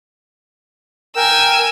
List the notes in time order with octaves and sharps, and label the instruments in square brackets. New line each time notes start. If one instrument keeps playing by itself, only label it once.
[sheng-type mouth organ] A#4 G5 [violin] G#5 E6